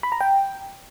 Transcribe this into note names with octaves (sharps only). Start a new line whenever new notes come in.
B5
A#5
G5